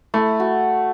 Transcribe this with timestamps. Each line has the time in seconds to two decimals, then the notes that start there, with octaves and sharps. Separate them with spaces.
0.14 A3 E4
0.40 F#4